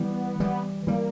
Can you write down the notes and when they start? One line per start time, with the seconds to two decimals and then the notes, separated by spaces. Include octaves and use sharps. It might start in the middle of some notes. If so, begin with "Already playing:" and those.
Already playing: E3 G3 B3
0.40 E3 G3
0.87 E3 G3 A#3